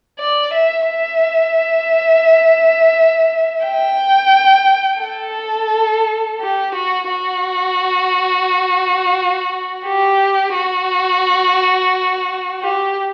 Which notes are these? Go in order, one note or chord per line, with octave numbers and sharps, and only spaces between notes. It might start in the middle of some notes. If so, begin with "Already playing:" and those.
D5
E5
E5
G5
A4
G4
F#4
F#4
G4
F#4
G4